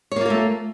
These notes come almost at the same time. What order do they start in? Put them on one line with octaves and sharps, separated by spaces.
C#5 A#3 F4 A#4 A3